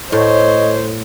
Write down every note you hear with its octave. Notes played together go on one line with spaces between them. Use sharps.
A2 C5 C#5 D#5